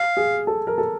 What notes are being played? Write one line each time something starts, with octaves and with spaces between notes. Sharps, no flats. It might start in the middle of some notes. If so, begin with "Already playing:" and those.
Already playing: F5
G#4
A4
A#4
A4